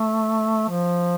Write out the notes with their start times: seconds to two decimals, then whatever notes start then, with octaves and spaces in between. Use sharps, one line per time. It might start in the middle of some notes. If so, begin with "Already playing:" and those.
Already playing: A3
0.69 F3